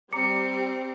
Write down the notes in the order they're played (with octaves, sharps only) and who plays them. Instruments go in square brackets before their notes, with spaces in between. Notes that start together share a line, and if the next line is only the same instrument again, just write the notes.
[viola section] G3 [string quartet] C4 [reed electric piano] A#5 D6 [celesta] C#7